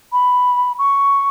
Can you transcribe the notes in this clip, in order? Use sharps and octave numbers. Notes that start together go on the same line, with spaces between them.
B5
C#6